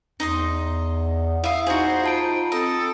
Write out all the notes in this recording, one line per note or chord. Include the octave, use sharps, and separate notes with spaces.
E2 D#4 D#5 C6
E4 E5 F5 D#6
D#4 F#4 G#4 C5
F4 A5 D7
C4 A4 D#5